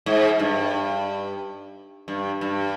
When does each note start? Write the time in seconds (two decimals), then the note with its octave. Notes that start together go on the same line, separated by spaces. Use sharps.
0.06 G#2
0.39 G2
2.08 G2
2.41 G2